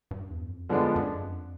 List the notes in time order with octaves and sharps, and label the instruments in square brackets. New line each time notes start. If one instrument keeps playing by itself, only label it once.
[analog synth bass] G2
E2
F2
[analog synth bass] G2 [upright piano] D3 F3 G#3 B3 D4
[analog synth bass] F#2
F2